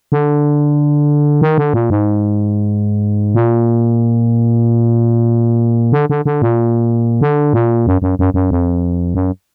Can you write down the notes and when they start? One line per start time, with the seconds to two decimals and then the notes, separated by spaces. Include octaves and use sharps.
0.12 D3
1.42 D#3
1.58 D3
1.74 A#2
1.90 G#2
3.35 A#2
5.92 D3
6.10 D3
6.25 D3
6.42 A#2
7.21 D3
7.53 A#2
7.87 F#2
8.02 F#2
8.19 F#2
8.34 F#2
8.51 F2
9.15 F#2